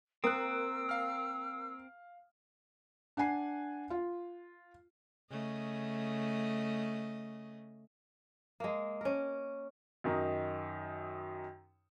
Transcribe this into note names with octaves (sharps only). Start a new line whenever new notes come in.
A#3 C4 D#6 E6 F#6
F5 F6
D4 F#5 G#5 C7
F4
C#3 A3 D#5
G#3 A#3
C#4 A#4
F#2 D#3 D#4